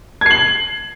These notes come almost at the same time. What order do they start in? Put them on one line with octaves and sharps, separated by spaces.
G#6 C7 F#7